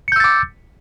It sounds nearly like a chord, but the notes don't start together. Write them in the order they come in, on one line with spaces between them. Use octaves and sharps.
C#7 G6 E6 A6 D6